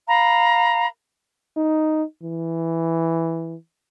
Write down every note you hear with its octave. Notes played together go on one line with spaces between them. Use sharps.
F5 A#5 B5
D#4
E3